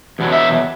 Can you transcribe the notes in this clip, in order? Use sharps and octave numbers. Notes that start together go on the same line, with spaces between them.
E2 B2 F#3
E5